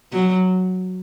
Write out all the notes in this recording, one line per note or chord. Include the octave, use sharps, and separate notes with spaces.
F#3